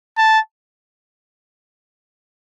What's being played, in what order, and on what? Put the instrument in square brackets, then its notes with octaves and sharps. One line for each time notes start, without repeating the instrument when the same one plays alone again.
[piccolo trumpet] A5